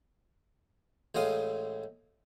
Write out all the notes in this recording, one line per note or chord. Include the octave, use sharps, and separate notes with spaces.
A1 A2 G#3 F5 D#6